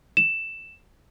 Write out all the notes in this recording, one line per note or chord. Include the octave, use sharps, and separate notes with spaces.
E7